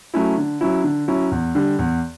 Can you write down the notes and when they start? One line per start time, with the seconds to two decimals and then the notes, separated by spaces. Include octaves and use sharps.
0.14 F#3 A3 C#4 E4
0.37 D3
0.61 F#3 C#4 E4
0.84 D3
1.08 F#3 C#4 E4
1.31 E2
1.55 D3 G3
1.79 E2